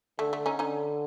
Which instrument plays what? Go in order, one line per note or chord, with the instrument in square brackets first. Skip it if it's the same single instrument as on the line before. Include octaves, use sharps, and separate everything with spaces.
[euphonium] D3 [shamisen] A3
[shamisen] A3
C#4 D#4
[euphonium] D3 [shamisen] C#4 D#4